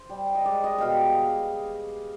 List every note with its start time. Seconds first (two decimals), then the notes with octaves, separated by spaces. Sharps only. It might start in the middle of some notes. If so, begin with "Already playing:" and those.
Already playing: C5
0.09 G3
0.35 D#5
0.45 G#3 D5
0.64 D#5
0.78 B2 F5 G5